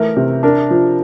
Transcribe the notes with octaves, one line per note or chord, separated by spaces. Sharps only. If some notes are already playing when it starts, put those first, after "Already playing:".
Already playing: E3 A3 A#4
C3
D4 A#4
F3